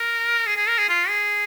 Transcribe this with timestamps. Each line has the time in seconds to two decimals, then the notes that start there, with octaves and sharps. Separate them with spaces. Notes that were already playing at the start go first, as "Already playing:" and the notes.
Already playing: A#4
0.47 G#4
0.57 G#4
0.68 A#4
0.78 G#4
0.89 F4
1.09 G#4